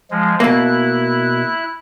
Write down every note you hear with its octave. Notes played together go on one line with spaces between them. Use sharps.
F3 G#3
B2 A#3 E4 F#6